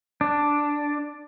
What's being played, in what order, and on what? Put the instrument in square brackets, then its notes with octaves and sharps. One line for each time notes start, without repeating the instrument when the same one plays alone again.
[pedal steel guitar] D4